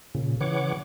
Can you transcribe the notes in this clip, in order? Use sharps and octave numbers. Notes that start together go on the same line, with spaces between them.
A#2 C#3
C#3 E3 C#5 F#5 D6